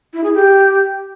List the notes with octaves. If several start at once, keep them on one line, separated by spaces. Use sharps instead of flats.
E4
G#4
G4